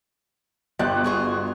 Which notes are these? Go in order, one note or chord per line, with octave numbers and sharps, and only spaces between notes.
G1 G3 F#6
F4 F#4 G#4